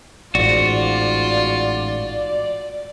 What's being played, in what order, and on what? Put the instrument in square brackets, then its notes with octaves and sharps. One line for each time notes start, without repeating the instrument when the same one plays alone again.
[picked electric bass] A1 G#2 [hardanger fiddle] F4 [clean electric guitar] F#4 [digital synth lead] D5